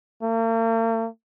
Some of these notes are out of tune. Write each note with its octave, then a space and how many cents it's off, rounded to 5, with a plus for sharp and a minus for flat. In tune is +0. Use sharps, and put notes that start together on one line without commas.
A#3 -45